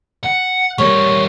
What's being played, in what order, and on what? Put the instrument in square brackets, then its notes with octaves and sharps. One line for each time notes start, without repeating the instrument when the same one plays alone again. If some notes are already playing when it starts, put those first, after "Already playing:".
[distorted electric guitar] F#5
[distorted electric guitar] G3 A#3 [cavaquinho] C#5